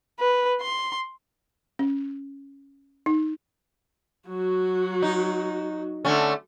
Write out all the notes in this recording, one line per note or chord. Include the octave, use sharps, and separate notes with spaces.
B4
C6
C#4
D#4
F#3 F#4
D#4
D3 A3 C#4